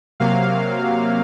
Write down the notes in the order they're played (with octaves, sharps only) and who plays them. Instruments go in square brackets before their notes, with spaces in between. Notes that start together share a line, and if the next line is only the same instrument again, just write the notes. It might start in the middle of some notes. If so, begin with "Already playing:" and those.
[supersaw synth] C3 F#3 A#3 F5